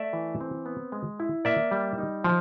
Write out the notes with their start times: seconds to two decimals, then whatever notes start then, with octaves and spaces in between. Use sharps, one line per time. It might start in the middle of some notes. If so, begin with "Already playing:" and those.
Already playing: A3 D5 E5
0.13 E3
0.41 C4
0.66 B3
0.92 G#3
1.20 E4
1.45 A#3 D5 E5
1.71 G3
1.98 D#4
2.24 F3